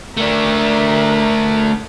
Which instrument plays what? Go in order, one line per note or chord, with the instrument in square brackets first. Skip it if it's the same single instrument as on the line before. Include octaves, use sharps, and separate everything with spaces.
[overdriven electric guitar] A3 D4 [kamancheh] A#4 E5